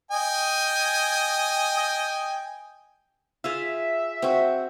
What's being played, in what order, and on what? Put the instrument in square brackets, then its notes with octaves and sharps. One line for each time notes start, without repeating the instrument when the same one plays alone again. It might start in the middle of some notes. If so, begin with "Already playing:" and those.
[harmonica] D#5 G5 G#5
[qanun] F4 G#4 F5 [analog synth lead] E5
[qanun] C4 F#4